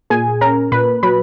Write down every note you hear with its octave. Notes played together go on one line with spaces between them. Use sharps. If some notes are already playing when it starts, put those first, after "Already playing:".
A#2 G#4 G#5
C#4 A#4 A#5
A#2 B4 B5
F#3 B4 B5